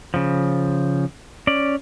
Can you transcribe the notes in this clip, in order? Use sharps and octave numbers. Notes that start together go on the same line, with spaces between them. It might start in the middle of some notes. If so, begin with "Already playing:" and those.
C#3 F3
C#4 D5